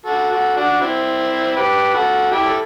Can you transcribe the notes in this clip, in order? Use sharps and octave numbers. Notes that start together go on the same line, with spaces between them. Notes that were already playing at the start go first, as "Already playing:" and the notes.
F#4 A4
F#4 A4
D4 F#4
C4 E4
G4 B4
F#4 A4
E4 G4
A4